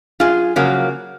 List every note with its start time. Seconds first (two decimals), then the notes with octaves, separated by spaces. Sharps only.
0.20 F#2 F4 G#4
0.56 C#3 F3 F#3 A#3